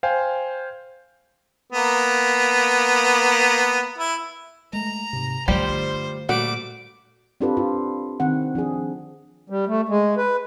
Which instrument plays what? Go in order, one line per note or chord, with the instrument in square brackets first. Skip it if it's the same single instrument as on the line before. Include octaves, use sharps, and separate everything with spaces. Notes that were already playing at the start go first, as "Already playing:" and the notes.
[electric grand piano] C5 F5 G5 G#5
[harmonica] A#3 B3
E4
[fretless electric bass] G#3 A3 [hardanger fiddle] A#5
[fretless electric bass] G#2 C3
[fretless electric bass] G2 [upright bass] D3 A3 [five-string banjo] F3 G3 G4 [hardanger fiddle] C5
[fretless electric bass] A#2 [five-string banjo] G3 A3 F#4 [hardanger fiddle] D6
[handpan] C4 D4 F4 G4 A4 B4
F4
D#3 C4 F#5
F3 D4 G#4
[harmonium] G3
A3
G#3
B4